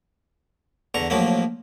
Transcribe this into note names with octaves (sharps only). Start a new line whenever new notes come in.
E2 D3 A#5 C#6
A#1 A2 F3 F#3 A#3